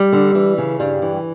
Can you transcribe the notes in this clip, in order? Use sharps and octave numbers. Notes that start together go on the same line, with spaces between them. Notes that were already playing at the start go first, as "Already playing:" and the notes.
Already playing: G3
D3
E3
C#3
G2 G3
E3